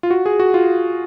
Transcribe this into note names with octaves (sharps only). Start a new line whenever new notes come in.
F4
F#4
G#4
F#4
F4